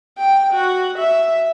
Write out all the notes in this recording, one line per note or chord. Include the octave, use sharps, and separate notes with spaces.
G5
F#4
E5